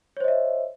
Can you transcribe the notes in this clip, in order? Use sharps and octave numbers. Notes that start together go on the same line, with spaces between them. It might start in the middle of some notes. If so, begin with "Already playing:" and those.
C5 C#5 D#5 E5